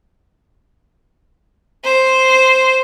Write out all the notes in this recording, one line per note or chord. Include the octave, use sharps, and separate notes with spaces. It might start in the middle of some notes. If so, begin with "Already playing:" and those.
C5